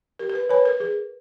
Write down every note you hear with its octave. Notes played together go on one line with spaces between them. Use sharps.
G4 A#4
A#4
B4
B4 C#5 G#5 B5
A#4
G#4 A#4